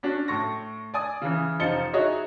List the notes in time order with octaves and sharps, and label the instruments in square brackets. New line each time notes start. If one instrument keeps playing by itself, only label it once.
[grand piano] C#4 D4 F#4
A2 C#6 A#6
D5 G#5 D#6
C#3 E3
F1 F3 D#4 A6 C#7 G7
D#4 E4 F#4 G#4 C#5 D#5